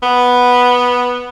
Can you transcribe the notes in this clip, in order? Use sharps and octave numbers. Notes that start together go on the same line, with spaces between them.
B3